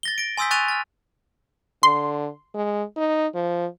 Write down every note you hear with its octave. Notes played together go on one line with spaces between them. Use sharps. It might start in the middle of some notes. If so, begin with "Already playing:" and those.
A6 A#6 G7
A#6 D7
G#5 C6 D#6 E6 G6 B6
G#5 C#6 F#6 A6 D#7 F7
F6 A6
D3 C6
G#3
D#4
F3